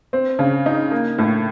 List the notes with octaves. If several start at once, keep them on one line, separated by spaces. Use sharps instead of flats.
C4
C#3
D#4
A#3
A2